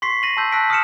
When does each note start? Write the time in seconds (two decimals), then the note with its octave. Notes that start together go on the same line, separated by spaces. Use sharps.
0.02 C6 C#6 B6 C7
0.23 A#6 D#7 F#7
0.37 A5 C6 E6 G6
0.52 A5 E6 F#6 A#6 B6 D7
0.70 D#6 F6 C#7 E7